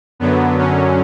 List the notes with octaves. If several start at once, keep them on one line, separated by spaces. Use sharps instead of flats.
F#2 D3 F#3 B3
C#4